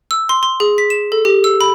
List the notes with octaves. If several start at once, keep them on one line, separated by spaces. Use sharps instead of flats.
E6
C6
C6
G#4
B6
E7
A4
G4
E6
B5